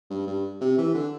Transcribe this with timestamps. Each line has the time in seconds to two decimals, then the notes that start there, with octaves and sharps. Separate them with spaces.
0.10 G2
0.27 G2
0.61 C3
0.78 E3
0.95 D3